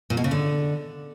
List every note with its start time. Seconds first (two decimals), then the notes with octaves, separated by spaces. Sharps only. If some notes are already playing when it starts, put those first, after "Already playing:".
0.10 A#2
0.17 B2
0.24 C#3
0.31 D3